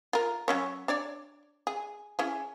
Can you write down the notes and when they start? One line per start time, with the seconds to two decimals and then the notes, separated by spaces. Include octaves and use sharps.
0.13 F4 A#4
0.48 F#3 C#4 C#5
0.88 D4 C#5 D5
1.67 G#4
2.19 C#4 E4 G#4